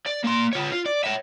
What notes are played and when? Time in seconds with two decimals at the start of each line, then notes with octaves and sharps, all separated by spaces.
0.06 D5
0.24 A#3 C6
0.53 F4 C#5
0.72 F4
0.86 D5
1.03 C#5 E5